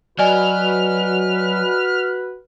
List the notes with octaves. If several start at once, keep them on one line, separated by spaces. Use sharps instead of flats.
F#3 F#4 B4 D5 D#5 G#5 F6